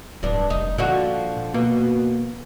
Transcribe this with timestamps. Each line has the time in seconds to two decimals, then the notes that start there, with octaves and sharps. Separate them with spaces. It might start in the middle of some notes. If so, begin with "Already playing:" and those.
0.23 D1 G2 D4
0.50 F1 D#4
0.78 A#2 D3 F3 F#4
1.54 B2 A#3